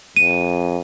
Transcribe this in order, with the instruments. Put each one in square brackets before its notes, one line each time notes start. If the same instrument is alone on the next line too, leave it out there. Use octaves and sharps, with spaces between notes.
[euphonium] F2 [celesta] D#7